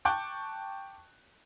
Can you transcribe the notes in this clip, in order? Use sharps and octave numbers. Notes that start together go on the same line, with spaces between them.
G5 A5 C#6 D6 F#6 G6